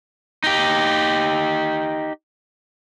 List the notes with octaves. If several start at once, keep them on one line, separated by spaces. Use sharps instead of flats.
D#4 G4